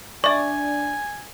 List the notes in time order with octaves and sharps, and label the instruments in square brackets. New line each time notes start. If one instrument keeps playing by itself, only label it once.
[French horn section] D4 [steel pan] D5 [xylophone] E5 C#6 [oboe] G#5